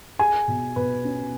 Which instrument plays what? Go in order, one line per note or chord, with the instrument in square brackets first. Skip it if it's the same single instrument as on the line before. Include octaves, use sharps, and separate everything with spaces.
[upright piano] G#4 [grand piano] G#5
[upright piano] B2
[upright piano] B2 [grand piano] B4
[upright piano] C#4